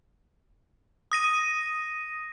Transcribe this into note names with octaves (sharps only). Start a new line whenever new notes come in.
D#6 A#6 D#7